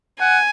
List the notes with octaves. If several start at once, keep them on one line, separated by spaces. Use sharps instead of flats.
F#5 G#5